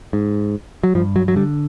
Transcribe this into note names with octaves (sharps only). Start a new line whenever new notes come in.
G#2
F#3
G2 F3
F#3
F#3
D3 G3